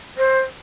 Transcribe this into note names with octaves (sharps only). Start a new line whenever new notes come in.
C5